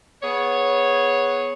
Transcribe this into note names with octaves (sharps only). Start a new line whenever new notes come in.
B3 G#4 C#5